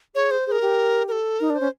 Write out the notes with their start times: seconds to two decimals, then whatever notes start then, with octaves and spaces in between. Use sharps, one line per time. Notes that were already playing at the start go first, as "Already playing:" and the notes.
0.15 G#4 C#5
0.31 C5
0.46 G#4 C5
0.52 A#4
0.62 G4
1.08 A#4
1.12 A4
1.40 D#4 A#4
1.50 D4
1.55 C5
1.61 C#4